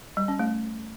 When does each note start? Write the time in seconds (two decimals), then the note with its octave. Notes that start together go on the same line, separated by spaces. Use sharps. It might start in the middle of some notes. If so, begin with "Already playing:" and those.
0.17 G3
0.28 C#4
0.39 A3